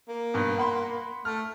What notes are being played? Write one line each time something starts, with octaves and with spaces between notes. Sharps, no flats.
A#3
G2 B2 B3
F#5 B5 C6
A3 F6